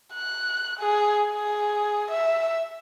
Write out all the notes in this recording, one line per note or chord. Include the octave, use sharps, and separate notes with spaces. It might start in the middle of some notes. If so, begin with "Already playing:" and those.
F#6
G#4
G#4
E5